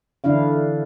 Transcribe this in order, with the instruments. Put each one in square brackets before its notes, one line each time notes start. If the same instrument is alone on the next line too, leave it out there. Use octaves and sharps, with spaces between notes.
[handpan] D3 E3 D4 E4 F5